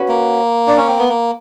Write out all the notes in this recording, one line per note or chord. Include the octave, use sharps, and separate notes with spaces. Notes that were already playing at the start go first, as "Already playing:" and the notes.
Already playing: C#4 F#4 B4
A#3
D4
C#4
C4
B3
A#3